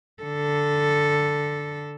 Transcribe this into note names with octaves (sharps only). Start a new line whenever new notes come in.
D3 A4